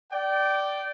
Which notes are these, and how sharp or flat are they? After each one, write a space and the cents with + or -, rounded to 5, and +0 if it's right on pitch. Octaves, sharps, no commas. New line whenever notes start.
D5 +0 G5 -25